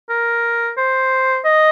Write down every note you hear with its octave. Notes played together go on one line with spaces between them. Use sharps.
A#4
C5
D#5